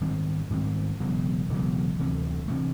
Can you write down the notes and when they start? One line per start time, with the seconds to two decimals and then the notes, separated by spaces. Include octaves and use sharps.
0.01 G#2 D#3 G3 C4
0.50 G#2 D#3 G3 C4
1.00 E1 E2 C#3 F#3
1.49 E1 E2 C#3 F#3
1.99 D2 C3 E3 A3
2.48 C3 E3 A3